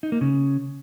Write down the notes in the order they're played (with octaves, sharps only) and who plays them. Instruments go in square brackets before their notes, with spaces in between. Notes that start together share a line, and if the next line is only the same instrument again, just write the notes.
[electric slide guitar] D#4
A#3
C#3